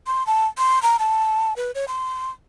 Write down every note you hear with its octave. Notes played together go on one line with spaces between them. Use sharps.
C6
A5
C6
A#5
A5
B4
C#5
C6